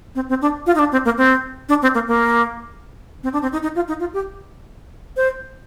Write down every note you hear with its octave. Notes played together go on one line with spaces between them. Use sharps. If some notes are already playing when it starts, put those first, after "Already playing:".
C4
C4
D4
F4
D#4
D4
C4
A#3
C4
D4
C4
A#3
A#3
C4
D4
C4
D#4
D#4
F4
D#4
F4
G4
C5